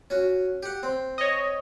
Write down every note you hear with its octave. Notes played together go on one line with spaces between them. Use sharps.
C#4 F#4
G4 F#5
C4
C#5 D#5